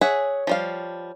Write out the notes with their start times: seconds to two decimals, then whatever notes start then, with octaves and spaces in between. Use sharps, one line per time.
0.01 G#4 C#5 E5 F#5
0.47 F3 G3 F5